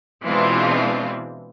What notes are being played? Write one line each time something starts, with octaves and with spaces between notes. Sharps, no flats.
B2 E3 G#3 C4 D4 F4